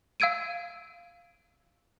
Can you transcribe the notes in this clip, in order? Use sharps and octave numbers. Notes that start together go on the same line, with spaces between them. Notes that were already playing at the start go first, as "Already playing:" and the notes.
F5 E6 G#6 D7 D#7